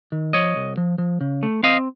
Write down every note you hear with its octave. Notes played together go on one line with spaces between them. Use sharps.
D#3
F3 C#5 D#5
C2
F3
F3
C#3
A3
C4 D#5 F5